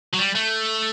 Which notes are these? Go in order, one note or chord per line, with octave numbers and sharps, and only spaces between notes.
F#3
G3
A3